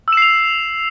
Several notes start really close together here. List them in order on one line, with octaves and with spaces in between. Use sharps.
E6 E7 C7 F7